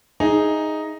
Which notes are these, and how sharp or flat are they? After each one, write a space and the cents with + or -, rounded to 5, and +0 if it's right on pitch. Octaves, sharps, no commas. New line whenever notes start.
D#4 +0 G#4 +0 E5 +0